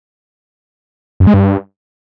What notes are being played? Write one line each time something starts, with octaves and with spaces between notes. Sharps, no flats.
F#2
G#3
G2